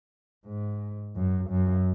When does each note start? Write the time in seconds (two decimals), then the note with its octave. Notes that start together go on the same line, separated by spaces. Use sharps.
0.47 G#2
1.15 F#2
1.50 F#2